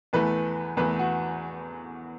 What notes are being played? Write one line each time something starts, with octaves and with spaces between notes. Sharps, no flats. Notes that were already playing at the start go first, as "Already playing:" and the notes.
E2 E3 A3 B4
E2 E3 A3 B4
F#4